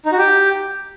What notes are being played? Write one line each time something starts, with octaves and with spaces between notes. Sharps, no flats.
D#4
F#4
G4